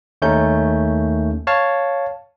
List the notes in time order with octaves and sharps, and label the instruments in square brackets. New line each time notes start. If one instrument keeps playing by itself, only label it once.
[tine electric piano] D#2 A3 C#4 D#4 G6
C#5 F5 A5